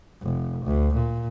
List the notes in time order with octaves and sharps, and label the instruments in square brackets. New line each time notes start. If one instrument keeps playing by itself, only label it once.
[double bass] F1
D2
A#2